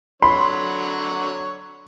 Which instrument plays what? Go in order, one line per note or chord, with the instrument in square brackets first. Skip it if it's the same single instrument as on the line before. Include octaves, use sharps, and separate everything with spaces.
[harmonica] D3 F#3 C#5 [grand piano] B5 [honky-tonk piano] C6